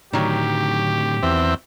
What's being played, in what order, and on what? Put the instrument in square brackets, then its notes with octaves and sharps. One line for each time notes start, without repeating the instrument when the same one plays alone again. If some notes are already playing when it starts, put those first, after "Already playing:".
[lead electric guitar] A2 D3 [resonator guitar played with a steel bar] D#3 F#3 [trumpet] G4
[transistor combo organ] E2 C4 E5